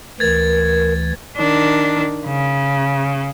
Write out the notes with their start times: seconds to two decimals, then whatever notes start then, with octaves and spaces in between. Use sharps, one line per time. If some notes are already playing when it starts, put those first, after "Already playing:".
0.20 D2 E3 A#4 G#6 A6
1.38 D#3 D4
2.26 C#3